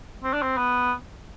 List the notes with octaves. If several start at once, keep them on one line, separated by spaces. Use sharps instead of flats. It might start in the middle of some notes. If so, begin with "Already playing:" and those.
C4
D4
C4
B3